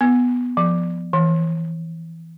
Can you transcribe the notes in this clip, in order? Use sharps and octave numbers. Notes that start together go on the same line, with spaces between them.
B3
F3
E3